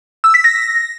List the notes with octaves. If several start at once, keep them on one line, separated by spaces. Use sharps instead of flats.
E6
B6
A#6